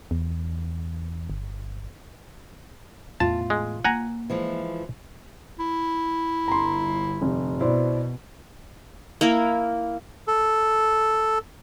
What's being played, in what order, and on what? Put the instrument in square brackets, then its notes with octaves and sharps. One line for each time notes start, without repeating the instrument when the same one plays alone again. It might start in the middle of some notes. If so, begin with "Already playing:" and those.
[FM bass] E2
G1
[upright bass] E2 A2 [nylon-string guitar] F4 [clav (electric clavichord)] A5
[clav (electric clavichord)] G#3
[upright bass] A#3 [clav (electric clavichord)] F#5 G#5 A#5
[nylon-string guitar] E3 F3 G#3
[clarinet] E4
[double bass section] G1 [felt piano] A#5 C6
[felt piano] F1
[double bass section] B2 [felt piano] E4 C5 D5
[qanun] A#3 E4 A#4
[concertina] A4